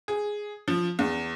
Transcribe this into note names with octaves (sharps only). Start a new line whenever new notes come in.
G#4
F3
E2